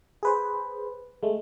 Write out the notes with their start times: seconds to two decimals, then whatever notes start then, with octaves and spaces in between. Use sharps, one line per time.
0.23 G#4 B4 C5
1.23 G#3 A3